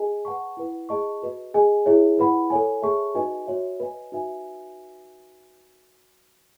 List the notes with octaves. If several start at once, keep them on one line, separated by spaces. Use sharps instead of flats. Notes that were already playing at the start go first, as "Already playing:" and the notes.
Already playing: G#4 D#5 G#5
B4 F#5 A5 C#6
E4 B4 F#5
G#4 D#5 A5 C#6
F#4 B4 D#5
G#4 D#5 G#5
E4 G#4 C#5 E5
E4 B4 F#5 B5
A4 C#5 G#5
G#4 C#5 E5 A5 C#6
D#4 F#4 B4 D#5 G#5
F#4 C#5 E5
B4 D#5 G#5
D#4 F#4 B4 E5 G#5